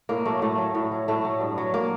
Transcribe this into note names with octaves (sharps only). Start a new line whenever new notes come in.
A2 A#3
F#3 A3
A2 A3
F#3
A2
F#3
A2 A3
F#3
G2
F#3
A#3